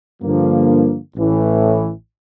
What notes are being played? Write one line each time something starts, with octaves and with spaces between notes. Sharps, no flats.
G2 D3 F3 A#3
A1 A2 E3